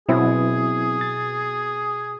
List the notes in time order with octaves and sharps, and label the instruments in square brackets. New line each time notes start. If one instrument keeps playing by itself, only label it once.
[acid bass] B2 [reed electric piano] F#3 C4 E4 [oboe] G#4
[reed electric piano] A6